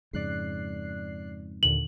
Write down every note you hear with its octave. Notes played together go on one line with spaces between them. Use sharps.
F2 G#2 C#3 D5 F#6 C7
D#2 A#2 D3 F#7